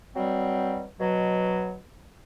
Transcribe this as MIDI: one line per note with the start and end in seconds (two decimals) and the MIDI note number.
0.16 0.86 47
0.16 0.86 54
0.16 0.86 55
0.16 0.86 60
1.00 1.75 47
1.00 1.75 54